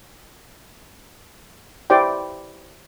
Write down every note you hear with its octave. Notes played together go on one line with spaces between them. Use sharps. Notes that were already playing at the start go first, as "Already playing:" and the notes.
E4 G4 C5 D5 G5